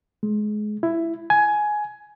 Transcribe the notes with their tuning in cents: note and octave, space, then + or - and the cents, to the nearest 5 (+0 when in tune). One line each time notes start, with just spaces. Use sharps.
G#3 +25
E4 +10
G#5 +15